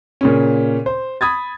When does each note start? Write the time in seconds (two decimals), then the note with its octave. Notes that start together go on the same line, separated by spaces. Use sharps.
0.21 A#2 C#3 C#4
0.86 C5
1.21 B5 D#6 G#6 A6